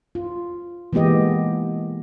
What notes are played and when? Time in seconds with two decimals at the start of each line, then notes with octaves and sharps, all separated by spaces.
0.15 F4
0.93 E3 G#3 A#3 B3 G4 D#5